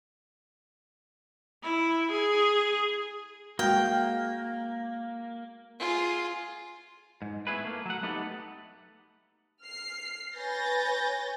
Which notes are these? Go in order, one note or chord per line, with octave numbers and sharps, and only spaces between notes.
E4
G#4
G#3 A#3 F#4 G5
F4 G#4
G#2
A3 B3 E4 G#4 B4
A3 A#3
F#3 F#5
A3 B3 D#4 G4 A4
F6 C7
B4 C#5 G#5 G6 A6 A#6